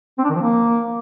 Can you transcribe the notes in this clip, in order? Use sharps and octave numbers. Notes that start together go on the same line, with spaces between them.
C4
D4
D#3
F3
A#3